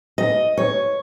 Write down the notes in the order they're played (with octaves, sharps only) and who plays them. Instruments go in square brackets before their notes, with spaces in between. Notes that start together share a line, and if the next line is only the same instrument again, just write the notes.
[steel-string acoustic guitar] D#5
C#5